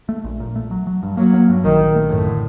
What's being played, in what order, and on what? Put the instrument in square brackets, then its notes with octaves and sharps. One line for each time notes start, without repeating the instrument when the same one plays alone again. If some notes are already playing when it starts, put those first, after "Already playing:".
[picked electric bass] A3
A#1
A#2
A3
F#3
F#3
G2
[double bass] F#3 [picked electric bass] A#3
[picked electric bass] A#3
G2
[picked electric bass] A#1 [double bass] D#3
[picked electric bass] A#1
A3
[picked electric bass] F#2 [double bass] A2
[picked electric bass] D3